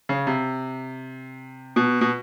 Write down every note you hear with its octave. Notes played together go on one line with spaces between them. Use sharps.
C#3
C3
B2
B2